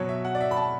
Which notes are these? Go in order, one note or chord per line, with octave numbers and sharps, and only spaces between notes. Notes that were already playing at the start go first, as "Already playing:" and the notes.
Already playing: B2 F#3 C#5
E5
F#5
D5
E5
B5
A5